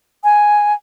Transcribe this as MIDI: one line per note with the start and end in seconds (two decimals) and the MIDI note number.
0.24 0.73 80